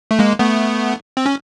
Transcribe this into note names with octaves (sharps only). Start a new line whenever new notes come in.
A3
G#3 A#3
A3 B3
C4
C#4